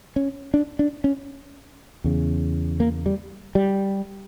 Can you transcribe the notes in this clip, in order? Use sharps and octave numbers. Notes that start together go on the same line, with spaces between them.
C#4
D4
D4
C#4
E2 C#3
A#3
G3
G3